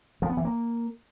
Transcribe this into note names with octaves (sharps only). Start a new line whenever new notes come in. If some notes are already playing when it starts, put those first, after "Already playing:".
F3
B3
E3
A#3